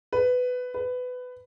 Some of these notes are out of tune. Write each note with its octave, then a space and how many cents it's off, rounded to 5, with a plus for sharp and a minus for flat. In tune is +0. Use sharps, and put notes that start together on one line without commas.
B4 +15
B4 +20